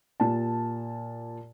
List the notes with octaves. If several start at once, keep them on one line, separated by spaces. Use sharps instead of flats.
A#2 G4 A5